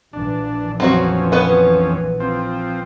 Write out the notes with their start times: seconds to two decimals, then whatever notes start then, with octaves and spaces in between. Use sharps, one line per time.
0.13 A#1 E3 D4
0.80 F2 F#3 C4 C#4 F#4
1.32 B3 B4 F#5
2.20 F3 C4